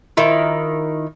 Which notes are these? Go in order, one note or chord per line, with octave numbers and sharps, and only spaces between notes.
D#3 E4 F4